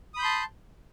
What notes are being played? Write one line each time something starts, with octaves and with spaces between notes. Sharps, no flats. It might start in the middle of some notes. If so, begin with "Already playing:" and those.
A5 B5 C6 D#6 G6